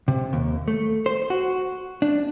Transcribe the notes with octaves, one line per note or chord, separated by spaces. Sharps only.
C3
D#2
A3
C5
F#4
D4